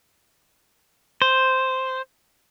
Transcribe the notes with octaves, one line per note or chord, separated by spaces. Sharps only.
C5